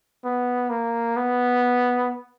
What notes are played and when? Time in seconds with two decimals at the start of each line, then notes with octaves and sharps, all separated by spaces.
0.24 B3
0.70 A#3
1.17 B3